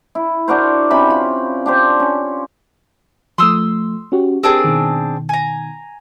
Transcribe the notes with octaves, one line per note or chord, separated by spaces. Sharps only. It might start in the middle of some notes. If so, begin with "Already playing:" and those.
E4
D4 F#4 A#4 C5
C3 C#4 B5
F4
D4 G4 C5
C#4
F3 A3 C6 D#6 E6
C#4 F#4 G4
C4 D4 G4 G#4 A#4
B2 D#3
G#5 A#5